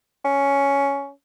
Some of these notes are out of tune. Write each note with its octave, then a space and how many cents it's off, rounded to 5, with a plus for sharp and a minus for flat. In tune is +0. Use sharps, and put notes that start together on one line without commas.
C#4 +10